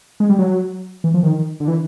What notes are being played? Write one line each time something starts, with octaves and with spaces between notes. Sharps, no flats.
G#3
G3
F#3
E3
F3
D#3
D3
E3